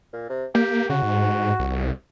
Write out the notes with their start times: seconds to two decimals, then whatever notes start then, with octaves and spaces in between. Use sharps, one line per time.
0.13 A#2
0.30 C3
0.55 A#3 G4
0.89 C#3 F#4
1.02 G#2
1.59 C2